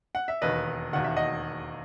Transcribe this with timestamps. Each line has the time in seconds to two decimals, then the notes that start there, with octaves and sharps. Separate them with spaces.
0.15 F#5
0.28 E5
0.42 E1 D#2 D#3 B4 D#5
0.93 E1 D#2 D#3 F#5
1.04 E5
1.16 D#5 F#5